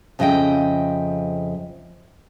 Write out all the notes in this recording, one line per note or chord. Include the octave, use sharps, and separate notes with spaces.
F2 C#3 F3 D#5 E5 G5